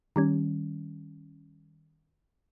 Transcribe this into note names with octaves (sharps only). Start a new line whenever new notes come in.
D#3 G3 C#4